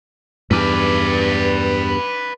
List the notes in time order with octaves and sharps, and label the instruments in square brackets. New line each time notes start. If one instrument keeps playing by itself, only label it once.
[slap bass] E2 G2 [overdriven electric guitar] B4 D5